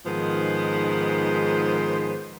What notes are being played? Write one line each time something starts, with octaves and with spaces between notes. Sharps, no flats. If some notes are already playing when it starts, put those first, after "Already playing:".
G#2 D#3 F3 B3 G#4 C5